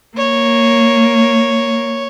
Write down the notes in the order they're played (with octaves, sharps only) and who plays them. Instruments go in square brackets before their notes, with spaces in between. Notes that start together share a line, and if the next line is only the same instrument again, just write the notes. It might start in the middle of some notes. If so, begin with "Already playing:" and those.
[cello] A#3 [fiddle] C#5